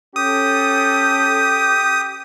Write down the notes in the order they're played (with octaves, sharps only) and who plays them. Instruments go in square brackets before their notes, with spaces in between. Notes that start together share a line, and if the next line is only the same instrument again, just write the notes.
[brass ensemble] C#4 A4 [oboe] G4 [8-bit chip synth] D#6